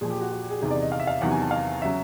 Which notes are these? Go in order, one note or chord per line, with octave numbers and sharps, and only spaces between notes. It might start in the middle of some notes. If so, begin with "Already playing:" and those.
A#2 F3 G#4
G4
F#4
F#4
G4
G#4
E2 C3 D#3 G#4
D5
D#5
F5
E5
F5
E2 C3 D#3 F#3 F#5
G#5
A5
F5
C#3 F#3 E5